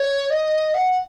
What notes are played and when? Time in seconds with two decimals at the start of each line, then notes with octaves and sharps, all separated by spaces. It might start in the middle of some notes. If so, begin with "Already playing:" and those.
Already playing: C#5
0.30 D#5
0.74 F#5